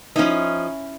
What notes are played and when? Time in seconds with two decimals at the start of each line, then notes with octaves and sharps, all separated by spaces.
0.16 F3 C#4 D#4 E4